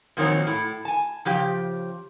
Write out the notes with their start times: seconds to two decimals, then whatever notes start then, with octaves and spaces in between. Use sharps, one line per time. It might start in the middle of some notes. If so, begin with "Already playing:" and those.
0.17 F2 A#2 D#3 F#3 C4 C#5
0.47 A2
0.85 G#5 A5
1.25 C#3 F3 G4 G5